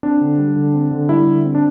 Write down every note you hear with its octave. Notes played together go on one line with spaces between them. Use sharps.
C4 D4
D3
G3
D3
C4
D3
G3 E4
D3
C4
D4